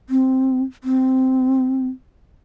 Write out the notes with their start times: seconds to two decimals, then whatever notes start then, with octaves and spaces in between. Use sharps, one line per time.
0.10 C4
0.84 C4